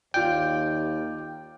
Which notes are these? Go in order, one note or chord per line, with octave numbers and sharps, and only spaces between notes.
D#2 F4 D5 G5